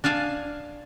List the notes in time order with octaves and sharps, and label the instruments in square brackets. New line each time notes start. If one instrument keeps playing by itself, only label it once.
[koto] D4 F5 G#5 A5